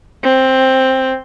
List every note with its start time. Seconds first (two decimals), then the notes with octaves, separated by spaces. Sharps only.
0.24 C4